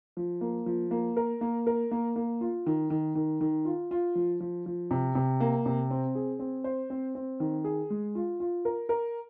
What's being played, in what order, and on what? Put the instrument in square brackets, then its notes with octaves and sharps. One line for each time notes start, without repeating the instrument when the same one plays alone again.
[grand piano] F3
A#3
F3
A#3
A#4
A#3
A#4
A#3
A#3
F4
D#3
D#3
D#3
D#3
F4
F4
F3
F3
F3
C3
C3
A#3
C3
C4
G#4
C4
C5
C4
C4
D#3
G#4
G#3
F4
F4
A#4
A#4